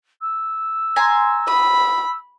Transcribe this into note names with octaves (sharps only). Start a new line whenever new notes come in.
E6
G#5 A#5 C6
B5 D#6